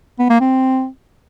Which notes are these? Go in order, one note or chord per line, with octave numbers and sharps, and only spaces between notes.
B3
A#3
C4